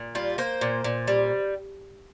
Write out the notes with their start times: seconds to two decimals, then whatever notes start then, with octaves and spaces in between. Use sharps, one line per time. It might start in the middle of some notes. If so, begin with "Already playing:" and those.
Already playing: A#2
0.15 G3 F4
0.38 A#3 C5
0.61 A#2
0.84 A#2
1.08 G3